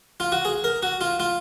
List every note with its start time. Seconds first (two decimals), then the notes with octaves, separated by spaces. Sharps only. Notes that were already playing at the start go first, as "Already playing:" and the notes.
0.20 F4
0.32 F#4
0.45 G#4
0.64 A#4
0.83 F#4
1.01 F4
1.20 F4